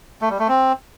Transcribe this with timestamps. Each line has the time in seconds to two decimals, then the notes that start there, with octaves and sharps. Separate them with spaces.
0.21 A3
0.30 G3
0.39 A3
0.48 C4